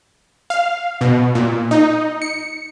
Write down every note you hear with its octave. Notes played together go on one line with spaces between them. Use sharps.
F5
B2
A#2
D#4
C#7